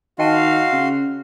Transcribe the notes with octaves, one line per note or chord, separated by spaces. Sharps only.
D#3 F#4 D#5 F5 G5 A5 C6
C#3